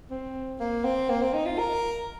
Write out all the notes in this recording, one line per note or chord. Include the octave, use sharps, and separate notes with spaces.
C4
A#3
C4
A#3
C4
D#4
F4
A#4